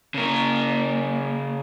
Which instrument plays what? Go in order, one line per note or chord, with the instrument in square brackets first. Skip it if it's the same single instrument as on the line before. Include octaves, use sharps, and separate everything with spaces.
[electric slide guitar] C#3 A#4 [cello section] A#3